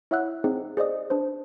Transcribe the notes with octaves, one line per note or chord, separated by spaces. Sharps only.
E4 C#5 E5 F#5 E6 F#6
C4 D#4 G#4 C5
G#4 C5 D5 D#5 D#6
D4 B4 C5